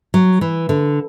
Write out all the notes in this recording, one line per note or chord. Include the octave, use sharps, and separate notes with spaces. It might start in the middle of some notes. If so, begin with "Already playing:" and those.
F#3
E3
D3